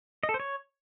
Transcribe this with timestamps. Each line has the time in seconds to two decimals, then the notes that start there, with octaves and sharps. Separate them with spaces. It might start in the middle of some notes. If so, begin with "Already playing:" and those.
0.23 D#5
0.29 A4
0.34 C5
0.40 C#5